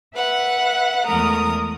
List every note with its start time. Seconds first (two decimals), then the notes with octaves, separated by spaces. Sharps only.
0.15 B4 E5 F#5 F#6
1.06 E2 G#3 A3 A#4 A#5 D#6